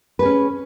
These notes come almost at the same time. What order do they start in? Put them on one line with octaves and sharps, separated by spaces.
B4 G#4 C#4